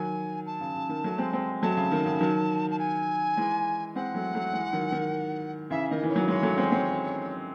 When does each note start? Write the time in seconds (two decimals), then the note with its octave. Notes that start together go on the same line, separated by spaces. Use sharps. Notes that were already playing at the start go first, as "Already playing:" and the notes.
Already playing: D#3 F#3 G#5
0.46 A5
0.61 C#3
0.75 C#3
0.89 D#3
1.04 F#3 A3
1.18 G#3 C4
1.33 G#3 C4
1.62 F#3 A3 A5
1.77 C#3
1.92 D#3
2.06 C#3
2.21 D#3 F#3
2.70 A5
2.79 G#5
3.37 E3 G#3
3.95 G#3 C4 F#5
4.15 F#3 A3
4.34 F#3 A3
4.53 E3 G#3
4.73 D#3 F#3
4.92 D#3
5.70 C#3 E3 E5
5.90 D#3 D#5
6.03 E3
6.09 C#5
6.16 F#3
6.28 E3 G#3 C#5
6.43 F#3 A3
6.58 G#3 C4
6.72 G#3 C4